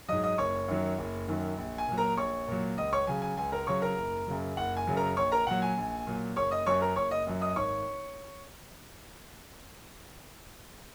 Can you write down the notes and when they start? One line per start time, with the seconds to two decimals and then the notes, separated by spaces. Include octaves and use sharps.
0.09 G#2 F#3 D#5 D#6
0.23 D#5 D#6
0.38 F#1 C#5 C#6
0.68 F#2 D#3 F#3
0.98 F#1
1.28 F#2 D#3 F#3
1.58 A#1
1.78 G#5
1.88 A#2 F#3
1.98 A#4 A#5
2.17 A#1 C#5 C#6
2.48 A#2 F#3
2.77 C#2 D#5 D#6
2.93 C#5 C#6
3.07 C#3 F#3 G#5
3.22 G#5
3.37 C#2 G#5
3.52 A#4 A#5
3.67 C#3 F#3 C#5 C#6
3.82 A#4 A#5
3.97 F#1
4.27 F#2 C#3 F#3
4.57 F#1 F#5
4.77 G#5
4.87 F#2 C#3 F#3
4.97 A#4 A#5
5.17 A#1 C#5 C#6
5.32 A#4 A#5
5.47 A#2 F#3 F#5
5.62 G#5
5.77 A#1
6.07 A#2 F#3
6.36 F#1 C#5 C#6
6.51 D#5 D#6
6.66 F#2 F#3 C#5 C#6
6.81 A#4 A#5
6.96 F#1 C#5 C#6
7.11 D#5 D#6
7.27 F#2 F#3
7.41 D#5 D#6
7.56 G#1 C#5 C#6